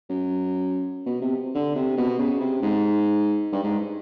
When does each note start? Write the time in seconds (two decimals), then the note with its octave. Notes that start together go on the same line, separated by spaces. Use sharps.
0.10 F#2
1.06 B2
1.22 C3
1.55 D3
1.75 C3
1.97 B2
2.18 C#3
2.40 C3
2.62 G#2
3.52 G2
3.63 G#2